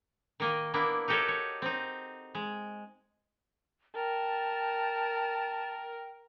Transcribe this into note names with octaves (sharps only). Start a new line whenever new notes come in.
D#3 A#3 D#5
A#3 B3 D4 E4
D#4 F#4 G4 A4 A#4 C#5
C#5
C4 D#4
G#3
A#4 G5 A5